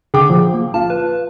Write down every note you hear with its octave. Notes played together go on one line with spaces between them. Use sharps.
D3 G#4 G5 D6
A#2 F3
A#3
F4 A5
B4